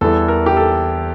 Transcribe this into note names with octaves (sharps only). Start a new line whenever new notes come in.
E2 E3 G3 A4
A#4
G4
A4